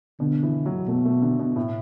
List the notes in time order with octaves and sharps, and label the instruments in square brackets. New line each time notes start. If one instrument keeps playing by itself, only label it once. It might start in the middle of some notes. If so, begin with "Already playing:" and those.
[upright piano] B2 [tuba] D3
[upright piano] E3
F#3
[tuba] B2 [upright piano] A3
[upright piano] A3
D3
B2
A2